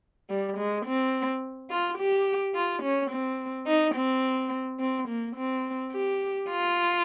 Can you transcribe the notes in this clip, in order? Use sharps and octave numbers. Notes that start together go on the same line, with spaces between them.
G3
G#3
C4
F4
G4
F4
C#4
C4
D#4
C4
C4
A#3
C4
G4
F4